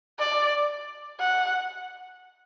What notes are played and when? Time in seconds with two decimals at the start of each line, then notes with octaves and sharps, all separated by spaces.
0.19 D5
1.20 F#5